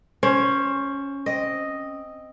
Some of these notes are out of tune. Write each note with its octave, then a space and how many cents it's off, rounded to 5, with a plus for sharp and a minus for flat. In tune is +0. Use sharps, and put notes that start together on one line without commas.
C#4 +0 C5 +20
C4 +0 D#5 +0